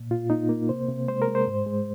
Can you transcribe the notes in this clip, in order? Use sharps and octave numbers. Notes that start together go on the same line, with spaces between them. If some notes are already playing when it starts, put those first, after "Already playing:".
Already playing: A#2
A#2 F4
A#3 D#4
A#3
C3 C5
C3
G#3 C5
A#4
G#3
C5
G#2
G#3